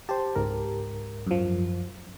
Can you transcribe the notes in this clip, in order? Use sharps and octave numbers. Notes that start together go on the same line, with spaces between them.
G4 C5 A5
C#2 G#2 A#4
F#2 F3